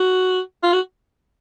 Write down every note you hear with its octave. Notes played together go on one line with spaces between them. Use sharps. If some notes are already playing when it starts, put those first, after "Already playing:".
Already playing: F#4
F4
F#4